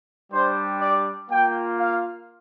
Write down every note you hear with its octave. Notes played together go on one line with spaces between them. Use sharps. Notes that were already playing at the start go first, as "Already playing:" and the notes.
G3 D4 G4 C5
D5
A#3 F4 G5
F5